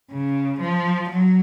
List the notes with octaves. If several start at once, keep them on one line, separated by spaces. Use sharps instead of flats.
C#3
F3
F#3